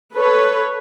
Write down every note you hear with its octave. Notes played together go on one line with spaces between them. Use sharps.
A4 B4 C#5